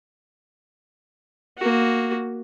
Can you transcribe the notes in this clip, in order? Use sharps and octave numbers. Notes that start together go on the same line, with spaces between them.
A#3 F#4